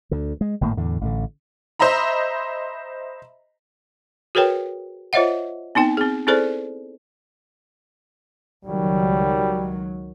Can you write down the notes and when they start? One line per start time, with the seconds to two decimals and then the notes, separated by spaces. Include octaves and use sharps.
0.11 D2 D3
0.41 G#3
0.61 G#1 A2 D#3 A#3
0.77 E2 A2 D3
1.01 A1 A2 D3
1.79 C5 D#5 E5 A#5 B5
4.35 F#4 G#4 A#4 B4 C#5 G5
5.13 F4 C5 C#5 D#5 E5 F#5
5.75 B3 C4 D#4 G5
5.97 C4 G#4
6.27 C4 E4 G#4 A4 C5 D5
8.65 C#2 D#3 F#3 G3